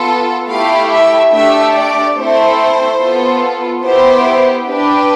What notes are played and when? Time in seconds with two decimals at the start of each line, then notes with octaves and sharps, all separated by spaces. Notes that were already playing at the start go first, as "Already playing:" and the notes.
Already playing: B3 F4 A4
0.48 A3 E4 G4 F5
0.91 E5
1.32 A3 D4 G4 E5
1.73 D5
2.16 A3 C4 E4 A4 C5
2.99 B3 F4 A4
3.82 B3 E4 G4 C5
4.66 D4 G4 B4